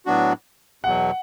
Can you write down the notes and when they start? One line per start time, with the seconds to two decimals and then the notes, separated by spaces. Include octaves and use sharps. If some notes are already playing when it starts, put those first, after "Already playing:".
0.06 A2 F#3 B3 D4 F#4
0.83 E2 B2 F#3 F#5